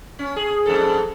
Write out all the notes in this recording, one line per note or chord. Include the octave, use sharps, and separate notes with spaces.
C#4
G#4
F2 G#2 A4